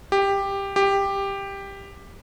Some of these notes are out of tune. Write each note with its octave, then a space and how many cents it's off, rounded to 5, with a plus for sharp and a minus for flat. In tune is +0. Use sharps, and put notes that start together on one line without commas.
G4 +10
G4 +10